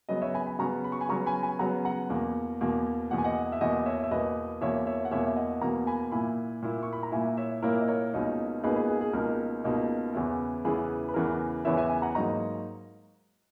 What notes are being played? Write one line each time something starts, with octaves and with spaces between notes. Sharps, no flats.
C#3 F#3 B3 B4 D#5
C#5 E5
G#5 B5
G#5 B5
C#3 F#3 B3 A#5 C#6
B5
C#6
G#5 B5
C#3 F#3 B3 A#5 C#6
G#5 B5
G#5 B5
C#3 F#3 B3 F#5 A#5
F#5 A#5
E2 B2 A#3
E2 B2 A#3
E2 B2 A#3 F#5
G#5
D#5 F#5
E5
E2 B2 A#3 D#5 F#5
C#5 E5
E5
E2 B2 A#3 B4 D#5
E2 B2 A#3 C#5 E5
C#5 E5
F#5
E2 B2 A#3 C#5 E5
E5
D#5 F#5
E2 B2 A#3 F#5 A#5
G#5 B5
A#2 A#3 E4 G#5 B5
A#2 A#3 E4
C#6
B5
A#5
A#2 A#3 E4 E5 G#5
C#5 E5
A#2 A#3 E4 A#4 C#5
D#5
A#4 C#5
C#2 B2 A#3 D#4
C#2 B2 A#3 D#4 G#4 B4
G#4 B4
G#4
G#4
C#2 B2 A#3 D#4 A#4
C#2 B2 A#3 D#4
E2 C#3 E3 B3 E4
E2 C#3 E3 B3 E4 G#4 B4
B4
E2 C#3 E3 B3 E4 A#4
E2 C#3 E3 B3 E4 C#5 E5
E5 G#5
E5 G#5
F#5 A#5
G#2 F#3 A#3 D#4 A#5 C#6